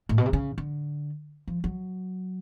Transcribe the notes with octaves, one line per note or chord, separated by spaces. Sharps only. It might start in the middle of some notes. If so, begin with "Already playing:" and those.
A2
B2
C3
C#3
D3
F3
F#3